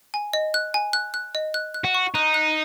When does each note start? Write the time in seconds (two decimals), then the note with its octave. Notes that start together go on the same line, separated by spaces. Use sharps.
0.14 G#5
0.33 D#5
0.54 F#6
0.74 G#5
0.93 F#6
1.14 F#6
1.35 D#5
1.54 F#6
1.74 F#6
1.84 F#4
1.95 C#6
2.15 D#4 F#6
2.34 F#6